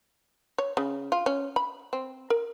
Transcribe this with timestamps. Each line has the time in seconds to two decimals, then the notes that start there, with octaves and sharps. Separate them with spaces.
0.58 C#5
0.77 C#3
1.12 F4
1.26 C#4
1.56 B5
1.93 C4
2.30 A#4